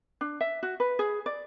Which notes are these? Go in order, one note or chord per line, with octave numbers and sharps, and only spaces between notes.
D4
E5
F#4
B4
G#4
D5